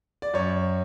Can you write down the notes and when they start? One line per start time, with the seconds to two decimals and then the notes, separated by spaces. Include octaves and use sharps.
0.22 D5
0.34 F#2 C#5